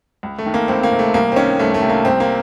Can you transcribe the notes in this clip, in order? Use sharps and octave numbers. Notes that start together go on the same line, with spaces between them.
C#2
A3
D#3
A#3
C#2 C4
A#3
C3
A3
C2 A#3
C4
D#3 C#4
C2 A3
A3
C3
A#3
C2 C4
A#3